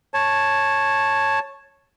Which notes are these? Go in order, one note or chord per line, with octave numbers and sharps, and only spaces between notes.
C#5 A5